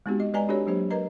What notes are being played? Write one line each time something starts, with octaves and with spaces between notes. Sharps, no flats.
G#3 B3 C4 D#4 F#4 G4
D#5
G#3 B4 D5 D#5 G#5 A#5
C4 D4 F#4 G4 A4 C#5
F#3 A#3 D4 G4 C5
A#4 B4 D#5 A#5